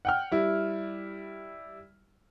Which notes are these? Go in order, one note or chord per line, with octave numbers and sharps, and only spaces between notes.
F#5 G5 F6
G3 E4